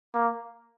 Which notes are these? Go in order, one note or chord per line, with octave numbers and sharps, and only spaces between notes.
A#3